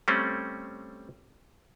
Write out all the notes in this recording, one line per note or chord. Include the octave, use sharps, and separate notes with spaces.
G3 A3 C4 C#4